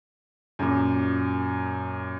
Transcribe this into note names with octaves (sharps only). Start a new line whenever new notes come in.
F#2 A#2